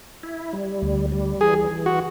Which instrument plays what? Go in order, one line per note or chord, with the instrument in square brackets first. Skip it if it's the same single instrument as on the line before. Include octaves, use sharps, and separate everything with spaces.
[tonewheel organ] E4
G3
D2
G3
[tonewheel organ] E3 [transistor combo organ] G#4
[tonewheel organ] E3
[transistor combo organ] F#4